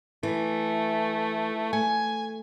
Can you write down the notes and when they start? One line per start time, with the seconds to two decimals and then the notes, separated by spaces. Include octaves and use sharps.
0.23 E3 A3
1.73 A3 G#5